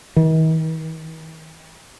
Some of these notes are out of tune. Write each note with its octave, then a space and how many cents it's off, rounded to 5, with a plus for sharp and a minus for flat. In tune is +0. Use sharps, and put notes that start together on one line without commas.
D#3 +45